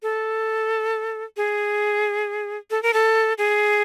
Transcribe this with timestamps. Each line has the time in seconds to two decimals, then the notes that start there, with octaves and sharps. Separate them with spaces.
0.03 A4
1.37 G#4
2.71 A4
2.83 A#4
2.93 A4
3.38 G#4